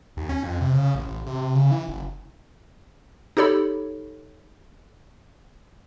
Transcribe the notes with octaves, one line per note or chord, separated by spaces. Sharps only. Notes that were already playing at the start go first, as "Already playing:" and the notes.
D#2
C#4
F2
C3
C#3
A1
A1
C3
C3
C#3
E3
F#1
D#4 G4 A4 C#5 B5